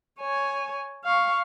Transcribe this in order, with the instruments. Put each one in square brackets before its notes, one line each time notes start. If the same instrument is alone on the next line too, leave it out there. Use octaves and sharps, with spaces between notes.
[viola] C#5 G#5
F5 C#6